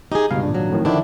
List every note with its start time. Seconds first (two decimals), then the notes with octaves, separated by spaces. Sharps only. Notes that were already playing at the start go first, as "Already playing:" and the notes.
0.12 D#4 G4 G#4
0.31 C#2 G2 B2 F5
0.43 G#1 A#2 D4
0.55 F#3
0.70 F2 A2 D#3
0.85 D3 D#3 F3 D4 E4